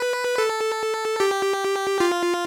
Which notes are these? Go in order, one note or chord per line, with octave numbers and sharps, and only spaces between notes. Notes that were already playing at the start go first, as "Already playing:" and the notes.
Already playing: B4
A4
G4
F4